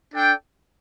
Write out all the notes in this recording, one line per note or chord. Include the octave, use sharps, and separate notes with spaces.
D4 A4 D5 G5